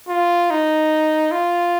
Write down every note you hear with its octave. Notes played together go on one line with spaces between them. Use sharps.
F4
D#4
F4